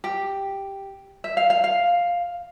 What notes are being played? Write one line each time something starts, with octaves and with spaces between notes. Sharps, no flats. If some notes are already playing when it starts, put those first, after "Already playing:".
G4
E5
F5
F5
F5